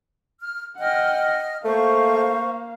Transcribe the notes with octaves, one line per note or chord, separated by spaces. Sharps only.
F6
D#5 F#5 G5 F6
A3 A#3 C5 F5 C#6